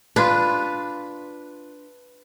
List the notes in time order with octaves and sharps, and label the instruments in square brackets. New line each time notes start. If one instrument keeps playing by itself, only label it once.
[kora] D4 F4 [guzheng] B4